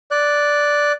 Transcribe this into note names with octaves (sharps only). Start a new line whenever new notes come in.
D5 F#6